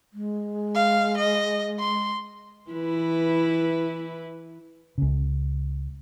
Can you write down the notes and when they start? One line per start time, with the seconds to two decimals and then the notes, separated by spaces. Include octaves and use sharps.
0.13 G#3
0.75 F5
1.18 D#5
1.79 C6
2.70 E3 E4 B4
4.98 C#2 C#3